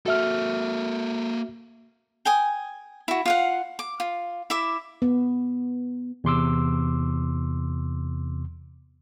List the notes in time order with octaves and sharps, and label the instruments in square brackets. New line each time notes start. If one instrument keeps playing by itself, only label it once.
[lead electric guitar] A#3 A4 [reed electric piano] F#4 E5 F6
[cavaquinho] G5 G#5 D#6
E4 F#4
F4 F5 F#5
D6
F4
E4 E5 D6
[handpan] B3
[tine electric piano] E2 C3 C6 D6 E6